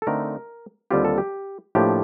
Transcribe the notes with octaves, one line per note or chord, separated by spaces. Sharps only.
A4
D3 A3 C4 D#4 A#4
D#2 D3 G3 C4 F4 G4
A4
G4
A2 F3 A#3 D4 G4